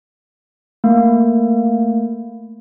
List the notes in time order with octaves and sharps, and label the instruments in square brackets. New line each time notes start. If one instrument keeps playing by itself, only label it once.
[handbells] A3 A#3